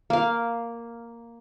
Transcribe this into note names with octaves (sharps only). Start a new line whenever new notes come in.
A#3 F5